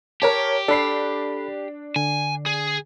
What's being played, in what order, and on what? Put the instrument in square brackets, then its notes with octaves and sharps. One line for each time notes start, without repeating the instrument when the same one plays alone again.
[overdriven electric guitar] G4 [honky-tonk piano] A#4 C#5 A5
[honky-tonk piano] D4 C7 [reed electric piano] A4 B5
[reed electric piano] D3 [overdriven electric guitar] G#5
[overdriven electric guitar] G#4